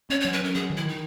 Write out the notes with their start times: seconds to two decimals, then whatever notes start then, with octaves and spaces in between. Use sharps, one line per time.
0.10 C#4 C#5
0.21 F#3 C#5
0.33 B4
0.41 C#4 A#4
0.54 F#3 G#4
0.70 D#3
0.77 E4
0.85 D#3 D#4